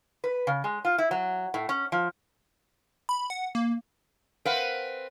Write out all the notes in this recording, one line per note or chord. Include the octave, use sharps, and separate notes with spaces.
B4
C#3
G#3
F4
E4
F#3
A2
C#4
F3
B5
F#5
A#3
C4 A#4 B4 F5 F#5